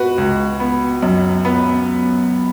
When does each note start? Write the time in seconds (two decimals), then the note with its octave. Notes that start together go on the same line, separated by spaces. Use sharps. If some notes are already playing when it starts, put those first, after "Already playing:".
Already playing: F#4 B4
0.18 C#2
0.60 B3
1.02 F#2
1.45 B3